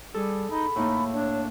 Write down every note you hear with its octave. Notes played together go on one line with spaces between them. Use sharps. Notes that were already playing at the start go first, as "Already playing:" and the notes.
G3 G#4 A4
D#4 B5
A2 A#3 D#4
D4 C#5